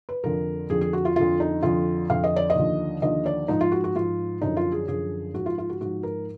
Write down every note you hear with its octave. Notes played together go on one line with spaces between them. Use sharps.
B4
F2 D3 F3 A#4
F2 D3 F3 G#4
G#4
F#4
F4
F2 D3 F3 F4
D#4
F2 D3 F3 F4
F2 D3 F3 F5
D#5
D5
D#5
D#2 D3 F3
D#2 D3 F3 D#5
D5
G#2 F3 D#4
F4
F#4
F#4
G#2 F3 F4
F#2 D3 F3 D#4
F4
G#4
F#2 D3 F3 G#4
G#2 F3 F#4
F4
F4
F#4
G#2 F3 F#4
A#4